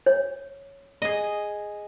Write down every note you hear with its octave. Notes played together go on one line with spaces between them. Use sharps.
C#5
G#4 D#5